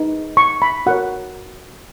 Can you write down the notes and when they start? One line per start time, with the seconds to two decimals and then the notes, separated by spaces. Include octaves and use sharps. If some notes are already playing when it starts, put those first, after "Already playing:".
Already playing: D#4 G#4 B4
0.37 C#6
0.62 B5
0.86 F#4 A#4 C#5 F#5